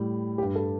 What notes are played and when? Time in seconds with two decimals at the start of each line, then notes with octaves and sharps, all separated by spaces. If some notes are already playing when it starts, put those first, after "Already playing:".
Already playing: A2 G3
0.38 G2 G3 G4
0.56 A4